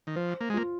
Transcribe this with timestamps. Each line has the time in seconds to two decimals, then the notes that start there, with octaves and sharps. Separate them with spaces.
0.07 D#3
0.16 F3 C5
0.41 A#3
0.50 G#3
0.54 A#3 F4